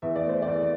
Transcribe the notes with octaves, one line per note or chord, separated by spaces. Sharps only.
E2 E5
D5
A3 C5
D5
E2